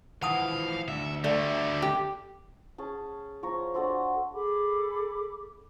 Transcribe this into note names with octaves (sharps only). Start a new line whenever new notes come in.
E3 F3 F5 F#5 A5 D#6
D2 E5
D3 G3 A3 D5 E5
G4
C#4 G#4 A5
F3 C#5 A#5
D4 F#4 A4 C5
G#4 A4 B5 D6